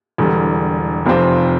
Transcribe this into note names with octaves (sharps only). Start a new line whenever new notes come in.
E1 E2 D3 G3
F1 F2 C3 F3 C4